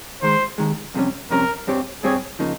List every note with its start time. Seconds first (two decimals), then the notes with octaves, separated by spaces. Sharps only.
0.22 D#2 D#3 G#3 C5
0.58 D#2 D#3 G#3
0.94 F2 C3 G3 C#4
1.30 F2 C3 G3 C#4 A#4
1.67 G2 G3 C4 G4 C#5
2.03 G2 G3 C4 G4 G#4 C#5
2.39 C#3 F3 A#3 D#4